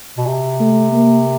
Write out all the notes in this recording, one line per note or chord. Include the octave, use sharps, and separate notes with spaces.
B2
C3
A3
A#3